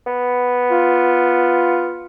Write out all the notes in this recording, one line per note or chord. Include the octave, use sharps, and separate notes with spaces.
B3
F4